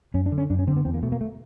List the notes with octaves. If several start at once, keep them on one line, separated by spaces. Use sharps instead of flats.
F#2 C#4
D4
D3
C#4
F#2 D4
C#4
D3 C4
B3
E2 C4
A#3
B2 A3
A#3
A3